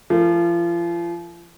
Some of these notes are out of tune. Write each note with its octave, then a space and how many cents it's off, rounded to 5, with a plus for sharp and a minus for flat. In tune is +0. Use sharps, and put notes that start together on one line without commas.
F3 -35 A#4 -45